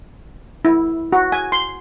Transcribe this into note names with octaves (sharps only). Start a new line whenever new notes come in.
E4
F#4
G#5
C6